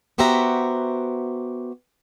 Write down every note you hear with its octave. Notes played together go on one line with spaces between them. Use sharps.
B3 F#4 G4 C5 E5 A#5